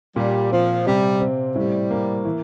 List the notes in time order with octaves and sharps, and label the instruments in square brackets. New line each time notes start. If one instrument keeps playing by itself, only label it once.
[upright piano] A#2 [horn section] G3
[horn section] F3 [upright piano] C4
[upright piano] C3 [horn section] G3
[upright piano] C4
[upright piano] A2 [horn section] G3
[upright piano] A#3
E3